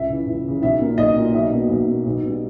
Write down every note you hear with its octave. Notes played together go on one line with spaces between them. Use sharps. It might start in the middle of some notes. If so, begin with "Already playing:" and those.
Already playing: C#2 E5
C#3 E3
C#2
C#3 E3
B1 E5
A#2 A#3
B1 D#5
A#2 A#3
B1 E5
B2 A#3
B1
B2 A#3
B1
B2 G3